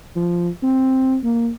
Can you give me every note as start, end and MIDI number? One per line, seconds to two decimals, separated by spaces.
0.16 0.48 53
0.63 1.16 60
1.24 1.49 58